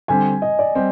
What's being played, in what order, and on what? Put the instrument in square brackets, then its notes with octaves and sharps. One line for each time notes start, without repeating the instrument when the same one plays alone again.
[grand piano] D3 G3 C4 [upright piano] G#5
[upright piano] D#5
D5
[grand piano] G3 C4